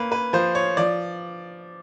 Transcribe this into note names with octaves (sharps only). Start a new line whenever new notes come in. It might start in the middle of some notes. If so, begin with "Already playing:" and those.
Already playing: A#3 C#4 B4
B4
F3 C5
C#5
F3 D5